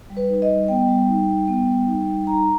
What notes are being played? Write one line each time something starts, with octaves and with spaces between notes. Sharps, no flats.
G3
B4
D#4
D#5
G3
B3 G5
G3
D#4
G3
B3
G3
D#4
G3
D#4 A#5